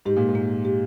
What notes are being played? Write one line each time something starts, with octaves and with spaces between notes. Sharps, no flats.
G#2 G4
A#2
G#2
A#3
G4